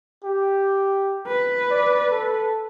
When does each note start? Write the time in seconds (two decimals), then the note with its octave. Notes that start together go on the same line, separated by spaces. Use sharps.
0.24 G4
1.27 B4
1.71 D5
2.12 A4